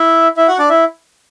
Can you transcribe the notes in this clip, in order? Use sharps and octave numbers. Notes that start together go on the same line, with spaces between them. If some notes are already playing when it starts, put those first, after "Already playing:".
Already playing: E4 E5
E4 E5
F#4 F#5
D4 D5
E4 E5